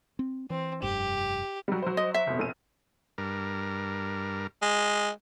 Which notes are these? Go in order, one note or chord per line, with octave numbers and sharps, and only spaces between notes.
C4
E3 C4
F1 G2 G4
F#3 G3
F#3 C5
D#5
E5
F1 B2
A#1 D#7
G2 A#4
G#3